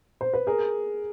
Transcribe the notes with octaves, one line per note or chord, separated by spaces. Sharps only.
C5
B4
G#4 A#4